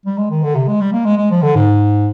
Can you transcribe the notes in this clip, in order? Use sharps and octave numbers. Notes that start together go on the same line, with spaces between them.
G3
G#3
D#3
D3
C3
G#3
G3
A#3
G#3
G#3
F3
D3
G#2